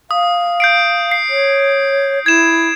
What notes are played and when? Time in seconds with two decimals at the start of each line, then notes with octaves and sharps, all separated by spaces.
0.11 F5 D#6
0.60 G6 C7 D7
1.11 C7
1.30 C#5
2.26 E4 G#6 E7